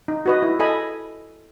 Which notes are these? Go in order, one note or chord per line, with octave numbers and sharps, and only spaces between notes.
D#4
F#4 B4 D#5
E4
A4 D#5 G#5 B5